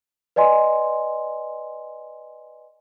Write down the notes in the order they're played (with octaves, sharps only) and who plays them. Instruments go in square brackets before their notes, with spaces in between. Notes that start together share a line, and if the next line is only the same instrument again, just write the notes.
[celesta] B4 D5 D#5 G#5 C6